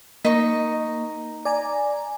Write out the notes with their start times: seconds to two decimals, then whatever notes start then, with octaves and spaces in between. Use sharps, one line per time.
0.25 A#3 D#4 C#6
1.45 D5 G#5 A#5